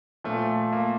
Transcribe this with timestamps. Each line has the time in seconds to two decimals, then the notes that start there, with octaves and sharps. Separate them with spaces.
0.24 A#2 F3 A3
0.73 A#3